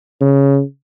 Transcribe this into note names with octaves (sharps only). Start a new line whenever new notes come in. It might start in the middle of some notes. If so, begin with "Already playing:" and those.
C#3